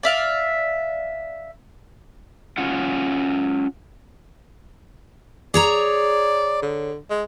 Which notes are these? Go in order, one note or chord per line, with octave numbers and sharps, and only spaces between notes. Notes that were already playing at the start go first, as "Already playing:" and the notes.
D5 E5 F5
C#4 F4 F#5
G#4 C#5 D5 A#5
D3
G#3